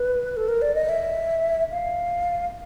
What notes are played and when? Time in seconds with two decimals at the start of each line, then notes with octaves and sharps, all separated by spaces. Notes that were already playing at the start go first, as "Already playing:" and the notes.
Already playing: B4
0.37 A4
0.48 A#4
0.62 D5
0.75 D#5
0.89 E5
1.72 F5